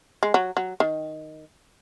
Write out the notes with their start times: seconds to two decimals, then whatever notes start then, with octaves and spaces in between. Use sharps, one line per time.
0.23 G#3
0.34 F#3
0.57 F#3
0.80 D#3